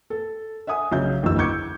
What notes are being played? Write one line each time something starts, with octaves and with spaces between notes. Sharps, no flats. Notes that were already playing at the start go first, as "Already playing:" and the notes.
A4
E5 F#5 G#5 D#6
B1 C#3 E5 G6
F#1 B1 E2 D3 E3 E6
C#6 D6 G6 G#6 C#7